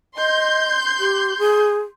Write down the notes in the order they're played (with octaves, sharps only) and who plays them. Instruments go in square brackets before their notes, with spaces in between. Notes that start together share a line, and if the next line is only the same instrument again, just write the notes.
[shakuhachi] D#5 [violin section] C6 G6
[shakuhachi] G4
G#4